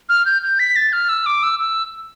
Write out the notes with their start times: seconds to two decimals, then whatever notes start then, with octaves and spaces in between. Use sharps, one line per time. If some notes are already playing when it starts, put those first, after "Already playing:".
0.09 F6
0.26 G6
0.42 G6
0.59 B6
0.76 A6
0.93 F6
1.09 E6
1.26 D6
1.43 E6
1.60 E6